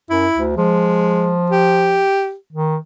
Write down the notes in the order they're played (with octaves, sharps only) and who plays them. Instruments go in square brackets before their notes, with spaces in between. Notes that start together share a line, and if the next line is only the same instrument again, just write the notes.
[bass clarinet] F#2 [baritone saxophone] E4
[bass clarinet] D2
[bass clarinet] F3 [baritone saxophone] G#3
[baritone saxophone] G4
[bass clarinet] D#3